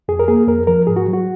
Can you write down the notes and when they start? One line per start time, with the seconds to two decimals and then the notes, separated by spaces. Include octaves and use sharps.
0.08 F2 G#4
0.19 A#4
0.28 A#3 G#4
0.47 F2 A#4
0.67 F3 A#4
0.87 G#2 G#4
0.96 F#4
1.08 F#3
1.13 F#4